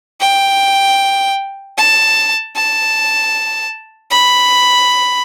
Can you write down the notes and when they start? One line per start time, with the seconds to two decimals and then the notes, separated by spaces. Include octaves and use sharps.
0.21 G5
1.77 A5
2.56 A5
4.11 B5